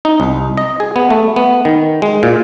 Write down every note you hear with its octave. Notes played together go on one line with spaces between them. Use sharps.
D#4
C2
D#5
G#4
B3
A3
B3
D#3
G#3
A#2